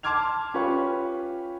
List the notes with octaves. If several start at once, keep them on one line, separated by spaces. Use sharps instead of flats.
A5 C6 D6 F6 G#6 F7
C#4 F4 G4 B4 C#6